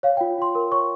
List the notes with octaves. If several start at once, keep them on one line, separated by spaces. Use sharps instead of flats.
C#5 F5
G5
F4
F4 C6
A#4 C6
C#5 C#6